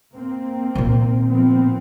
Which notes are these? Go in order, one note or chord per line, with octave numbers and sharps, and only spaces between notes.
A#3 C4
A#2 D#3
F3 B3 C4